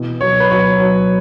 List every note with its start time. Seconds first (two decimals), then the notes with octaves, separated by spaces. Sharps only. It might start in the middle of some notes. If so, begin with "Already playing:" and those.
Already playing: B2 E3
0.21 F#3 C#5
0.40 B4
0.51 F#3 C#5
0.80 F#3